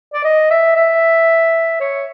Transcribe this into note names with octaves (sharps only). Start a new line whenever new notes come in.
D5
D#5
E5
E5
C#5